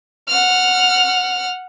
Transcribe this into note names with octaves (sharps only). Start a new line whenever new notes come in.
F#5 F6